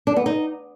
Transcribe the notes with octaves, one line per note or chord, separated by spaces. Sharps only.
D4
B3
D#4